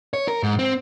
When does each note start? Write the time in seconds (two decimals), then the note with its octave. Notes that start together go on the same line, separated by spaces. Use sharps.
0.14 C#5
0.28 A#4
0.43 G#2
0.59 C4